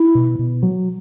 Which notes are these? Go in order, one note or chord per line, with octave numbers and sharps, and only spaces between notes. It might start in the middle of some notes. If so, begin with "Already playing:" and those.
Already playing: E4
B2
B2
F#3